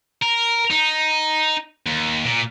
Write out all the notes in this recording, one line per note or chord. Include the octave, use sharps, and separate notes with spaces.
A#4
D#4
D#2
A#2